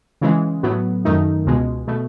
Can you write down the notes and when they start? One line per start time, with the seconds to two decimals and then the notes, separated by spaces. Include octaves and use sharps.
0.21 C#3 E3 G#3
0.63 A2 F#3 B3
1.05 F#2 D#3 A3 D#4
1.46 C#2 B2 G#3
1.87 B2 A3